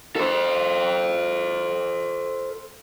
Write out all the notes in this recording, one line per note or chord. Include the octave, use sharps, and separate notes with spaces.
A4 C5